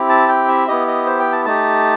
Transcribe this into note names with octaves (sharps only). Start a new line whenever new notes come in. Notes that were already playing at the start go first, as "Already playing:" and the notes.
Already playing: C4 E4 G4
A5
G5
E5
B3 E4 G4 D#5
D#5
C5
G5
A5
A3 D#4 G4 A5